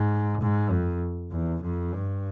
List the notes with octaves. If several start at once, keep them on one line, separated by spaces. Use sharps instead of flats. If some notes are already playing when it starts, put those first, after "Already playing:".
Already playing: G#2
G#2
F2
E2
F2
G2